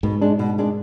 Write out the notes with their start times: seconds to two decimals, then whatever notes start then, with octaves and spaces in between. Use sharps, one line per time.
0.03 G#2 B2
0.21 G#3 D4
0.39 B2
0.58 G#3 D4